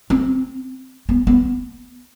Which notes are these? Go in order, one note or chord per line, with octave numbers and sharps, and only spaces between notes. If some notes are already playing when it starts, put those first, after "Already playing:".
C4
B3
B3